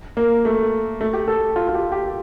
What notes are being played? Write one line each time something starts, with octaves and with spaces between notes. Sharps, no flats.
A#3
A3
A3
G4
A4
F4
F4
G4
G4